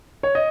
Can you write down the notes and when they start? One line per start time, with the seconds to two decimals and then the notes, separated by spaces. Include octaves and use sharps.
0.23 C#5
0.35 D#5